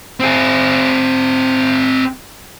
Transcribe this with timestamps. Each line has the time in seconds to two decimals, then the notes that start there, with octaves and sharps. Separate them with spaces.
0.20 C4 G#4